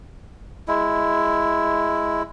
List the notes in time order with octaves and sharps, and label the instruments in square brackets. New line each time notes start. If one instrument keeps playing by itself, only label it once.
[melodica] G#3 E4